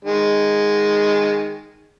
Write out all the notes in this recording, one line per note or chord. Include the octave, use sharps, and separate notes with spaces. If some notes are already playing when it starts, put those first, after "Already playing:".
D#3 G#3